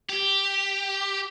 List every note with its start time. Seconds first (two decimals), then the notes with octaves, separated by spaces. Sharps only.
0.09 G4